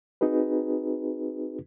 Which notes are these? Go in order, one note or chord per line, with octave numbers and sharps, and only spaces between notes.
C4 D#4 F#4 G#4 B4